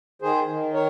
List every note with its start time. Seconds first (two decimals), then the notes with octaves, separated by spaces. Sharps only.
0.22 D#3 G#4 C5
0.48 D#3
0.74 A#4 C#5